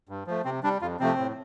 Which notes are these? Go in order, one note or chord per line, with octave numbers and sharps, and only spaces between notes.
G2
F3 A3
C3 C4
G3 D4
F2 F4
C3 F3 A3 C4
A2